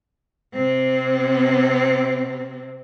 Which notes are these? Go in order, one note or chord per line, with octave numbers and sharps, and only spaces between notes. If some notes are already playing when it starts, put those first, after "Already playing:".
C3 C4